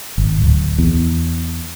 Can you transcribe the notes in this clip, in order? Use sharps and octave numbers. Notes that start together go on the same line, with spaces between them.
G#1
D1
E2